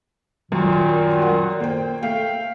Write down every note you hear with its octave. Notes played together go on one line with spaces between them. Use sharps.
F#2 A#2 D#3
F#2 F#5
A#3 C5 G5
A3 F5 G5